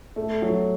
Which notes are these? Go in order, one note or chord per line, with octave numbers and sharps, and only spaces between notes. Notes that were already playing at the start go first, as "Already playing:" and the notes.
A3
F#3